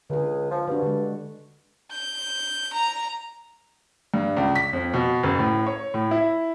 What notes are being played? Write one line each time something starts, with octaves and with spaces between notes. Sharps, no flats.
C#2 D3 G#4
F3
G2 D4 F#4
D3 G#3
G6
A#5
G2
C#2
B6
F2
B2
F#1
A2
C#5
A2
E4